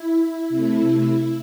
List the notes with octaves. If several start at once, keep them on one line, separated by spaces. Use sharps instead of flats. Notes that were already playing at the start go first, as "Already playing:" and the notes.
Already playing: E4
C3 A3 E4